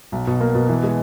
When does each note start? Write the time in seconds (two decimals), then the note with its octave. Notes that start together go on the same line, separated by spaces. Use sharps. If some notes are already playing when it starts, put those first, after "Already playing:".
0.12 B1
0.27 B2
0.41 A#3
0.55 B2
0.69 E3
0.83 G#3